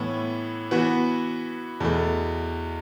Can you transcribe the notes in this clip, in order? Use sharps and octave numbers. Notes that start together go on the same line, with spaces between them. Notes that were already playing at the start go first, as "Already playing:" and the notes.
Already playing: A2 E3 B3
E3 B3 F#4
E2 B2 A3